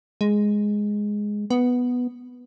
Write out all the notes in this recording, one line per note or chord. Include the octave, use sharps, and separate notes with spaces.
G#3
B3